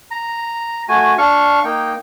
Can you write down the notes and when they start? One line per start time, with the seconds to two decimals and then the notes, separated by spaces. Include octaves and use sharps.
0.11 A#5
0.89 A3 F#4 G#5
1.18 D4 F5 C#6
1.65 A#3 D#4 G5